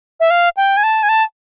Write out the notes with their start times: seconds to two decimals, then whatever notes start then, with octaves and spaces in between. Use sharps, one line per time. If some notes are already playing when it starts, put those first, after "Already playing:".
0.20 E5
0.30 F5
0.57 G5
0.77 G#5
0.83 A5
1.03 G#5
1.09 A5